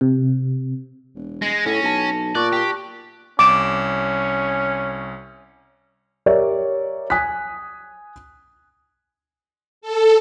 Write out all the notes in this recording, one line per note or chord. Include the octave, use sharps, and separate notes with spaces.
C3
E1
G#3 A#6
A2 C#4
B1 A5 A#6
A#2 D5 C#6 F#6
G4
C2 C#4 D6 E7
G4 A#4 C#5 D5 E5
G#5 D#6 F#6 B6
A4